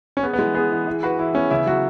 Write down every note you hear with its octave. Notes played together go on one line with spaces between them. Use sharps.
C#4
B3 G#4
B3
E3 G#3
B3 G#4
E3
E3
F#4 B4
E3 E4
B3 C#4
C#3 E4
F#3 F#4